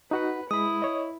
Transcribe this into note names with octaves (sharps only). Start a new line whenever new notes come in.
D#4 F#4 B4 F#5
G#3 E4 B5 D#6
C#5 D#5